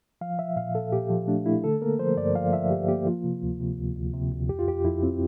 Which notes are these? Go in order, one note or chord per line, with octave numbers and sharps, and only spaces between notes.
F3 F5
F3 E5
A#2 F5
A#2 A4
A#2 G4
F3
A3 D4
A3 E4
D3 A4
A#3 A#4
F3 C5
G2 D5
F3 F5
F3 E5
G2 G4
A#3 G4
F3 F4
C3
D2
C3
D2
D2
C3
D2
F2 G4
F4
F2 G4
F2 E4
C4